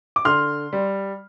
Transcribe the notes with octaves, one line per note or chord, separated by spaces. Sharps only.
D6
D3 C6 F6
G3